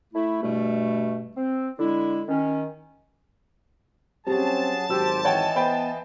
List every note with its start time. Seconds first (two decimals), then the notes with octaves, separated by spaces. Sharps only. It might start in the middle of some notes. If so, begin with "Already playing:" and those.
0.13 A3 E4
0.42 G2 B2 G3 A3
1.36 C4
1.79 D3 G#3 E4
2.28 D#3 C#4
4.27 F#3 G3 C4 C#4 G#4 A5
4.89 G#1 F#3 G4 C5 E6
5.25 E3 C#5 D#5 F#5 G5
5.56 B3 C5 G5 B5